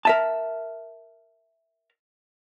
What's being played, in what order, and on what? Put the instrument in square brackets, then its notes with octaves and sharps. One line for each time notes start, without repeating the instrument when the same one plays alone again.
[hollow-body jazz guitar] A#4 E5 A5